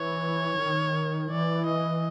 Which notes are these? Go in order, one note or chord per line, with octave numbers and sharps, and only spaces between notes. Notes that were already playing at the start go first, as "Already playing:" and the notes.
Already playing: E3 C#5
D#3
E3 D5
D#5